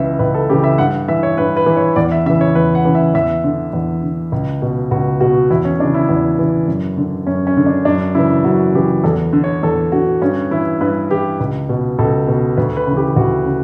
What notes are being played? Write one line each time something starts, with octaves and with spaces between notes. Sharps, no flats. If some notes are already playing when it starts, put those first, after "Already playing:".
Already playing: C#2 C#3 E3 E5
C#2 B4
A4
C#3 E3 G4
E5
G2 F#5
E3 E5
C#5
G2 B4
B4
E3
C#5
E2 D5
E5
C#3 E3 E5
C#5
E2 B4
F#5
C#3 E3
E5
E2 E5
D3
E2
D3
C#2
B2
C#2 F#4
B2 F#4
E2 E4
C#4
C#3 E3 D4
E4
E2
C#3 E3
F#2
D3
F#2 C#4
C#4
D3
D4
F#2 D4
C#3 E3 E4
F#2 F#4
C#3 E3 G4
E2 A4
D3
C#5
E2 A4
D3 F#4
G2 C#4
E3 E4
G2 B4
E3 G4
C#2
B2
C#2 A4
B2
D2 B4
B4
C#3 E3
G4
D2 F#4
C#3